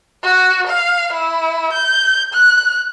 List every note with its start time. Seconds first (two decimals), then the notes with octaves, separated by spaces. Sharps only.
0.23 F#4
0.68 F5
1.13 E4
1.73 G6
2.34 F#6